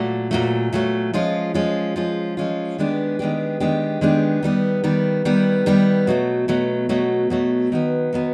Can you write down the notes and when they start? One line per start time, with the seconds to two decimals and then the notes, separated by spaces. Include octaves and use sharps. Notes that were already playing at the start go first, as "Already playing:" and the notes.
Already playing: A#2 F#3 A3
0.31 A#2 F#3 A3
0.73 A#2 F#3 A3
1.14 F3 G#3 C#4 F4
1.54 F3 G#3 C#4 F4
1.96 F3 G#3 C#4 F4
2.37 F3 G#3 C#4 F4
2.78 D#3 G#3 B3 D4 G4
3.19 D#3 G#3 B3 D4 G4
3.60 D#3 G#3 B3 D4 G4
4.01 D#3 G#3 B3 D4 G4
4.43 D#3 G3 B3
4.84 D#3 G3 B3
5.25 D#3 G3 B3
5.66 D#3 G3 B3
6.07 B2 F#3 A3
6.48 B2 F#3 A3
6.89 B2 F#3 A3
7.30 B2 F#3 A3
7.72 D#3 F#3 B3
8.13 D#3 F#3 B3